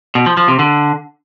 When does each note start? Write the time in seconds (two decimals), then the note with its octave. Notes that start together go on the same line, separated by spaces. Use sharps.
0.15 B2
0.26 F3
0.37 F3
0.48 C3
0.59 D3